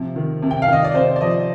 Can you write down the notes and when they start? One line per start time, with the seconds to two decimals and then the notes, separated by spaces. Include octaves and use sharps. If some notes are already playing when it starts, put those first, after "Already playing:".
Already playing: C3 F3
0.16 D#3
0.43 C3
0.51 G5
0.62 F5
0.68 D#3 D#5
0.84 D5
0.94 C3 C5
1.16 D5
1.21 F3 D#5